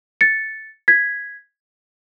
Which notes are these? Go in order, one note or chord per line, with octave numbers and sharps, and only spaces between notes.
A6 C#7
G#6 B6